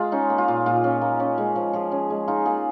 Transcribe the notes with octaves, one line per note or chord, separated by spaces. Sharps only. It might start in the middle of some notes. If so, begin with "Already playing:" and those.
Already playing: G#3 F4 G#4 A#5
C#4 D#4
A#3
F4
A#2
A#2 F4
C#4
A#3
C#4
G#3
F3
F3 G#4
C#4
G#3
D#4 F4
A#3 G#4